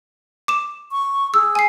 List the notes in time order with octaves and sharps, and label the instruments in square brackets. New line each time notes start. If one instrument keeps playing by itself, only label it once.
[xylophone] D6 E7
[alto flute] C#6
[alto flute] G#4 [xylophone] E6
[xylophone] G#5 C7